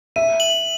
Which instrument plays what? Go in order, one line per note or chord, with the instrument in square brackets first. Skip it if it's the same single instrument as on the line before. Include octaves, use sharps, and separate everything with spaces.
[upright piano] E5 [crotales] D#7
[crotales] F#7